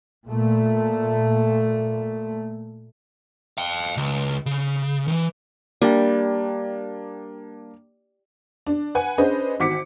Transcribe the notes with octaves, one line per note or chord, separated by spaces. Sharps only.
A#2 A3
F5 G5
C#2
C#3
D#3 E3
G3 A#3 D4 G5
D4
B4 F#5 G#5
C#4 D4 G#4 B4 C5 D#5
G#1 F#4 D6 B6 C#7